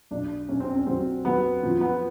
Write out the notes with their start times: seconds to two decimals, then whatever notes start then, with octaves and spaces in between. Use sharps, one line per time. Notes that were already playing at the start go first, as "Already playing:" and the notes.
0.11 B1 D4
0.49 B1 C#4
0.60 C4
0.72 C#4
0.86 F#3 C4
1.25 F#3 B3
1.63 F3
1.81 B3